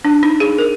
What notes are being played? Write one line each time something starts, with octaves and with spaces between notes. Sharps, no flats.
D4
D#4
G#4
A#4